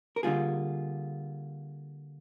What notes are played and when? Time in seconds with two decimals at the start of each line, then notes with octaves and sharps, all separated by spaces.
0.16 A#4
0.23 D3 G3 A#3 F4 G#4